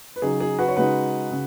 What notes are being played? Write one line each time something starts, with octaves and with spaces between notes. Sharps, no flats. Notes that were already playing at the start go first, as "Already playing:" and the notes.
B4
C#3 F#3 D#4 G#4
G#4
F#4 B4
C#5
C#3 G#3 D#4 F#4 B4
C#3